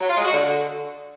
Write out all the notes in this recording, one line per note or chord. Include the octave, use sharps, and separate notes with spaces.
F#3
F4
G#3
F#4
D3